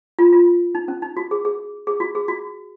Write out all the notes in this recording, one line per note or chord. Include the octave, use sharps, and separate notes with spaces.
F4
F4
D#4
C#4
D#4
F#4
G#4
G#4
G#4
F#4
G#4
F#4